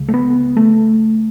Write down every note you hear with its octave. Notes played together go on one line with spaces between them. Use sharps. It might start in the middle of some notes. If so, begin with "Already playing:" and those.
Already playing: C#2 C#3
A3
B3
A3